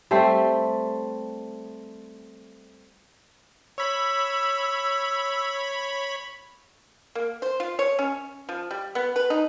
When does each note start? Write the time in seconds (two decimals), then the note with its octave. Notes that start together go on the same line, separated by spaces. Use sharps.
0.11 G3 A3 C4 C5
3.78 C#5 B5 E6
7.15 A#3
7.42 C5
7.60 F4
7.79 C#5
7.99 C#4
8.49 F3
8.71 G3
8.95 B3
9.16 B4
9.30 D#4